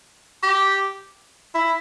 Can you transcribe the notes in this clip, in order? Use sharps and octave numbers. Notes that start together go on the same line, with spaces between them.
G4
E4